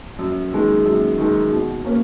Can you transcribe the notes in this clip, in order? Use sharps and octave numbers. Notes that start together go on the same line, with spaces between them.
F#2
D#3 G#3
F#2
D#3 G#3
B2
A#3 C#4